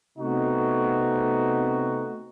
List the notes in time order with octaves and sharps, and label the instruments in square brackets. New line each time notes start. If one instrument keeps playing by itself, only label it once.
[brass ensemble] C3 A3 B3 C4 D#4 F#4